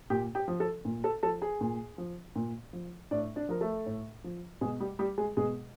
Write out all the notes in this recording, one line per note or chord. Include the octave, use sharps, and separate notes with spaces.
A#2 G4 G5
G4 G5
F3
A4 A5
A#2
A4 A5
F3 A4 A5
G#4 G#5
A#2
F3
A#2
F3
A2 D4 D5
D4 D5
F3 A#4
A3 A4
A2
F3
B2 G#3 G#4
G3 G4
G3 G4
G#3 G#4
B2 G#3 G#4